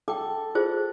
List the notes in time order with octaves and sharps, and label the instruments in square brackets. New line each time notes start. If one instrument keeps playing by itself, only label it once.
[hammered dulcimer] A4 [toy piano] G5 D6
[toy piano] F4 G#4 C5